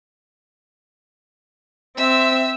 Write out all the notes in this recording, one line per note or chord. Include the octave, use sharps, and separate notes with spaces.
C4 E5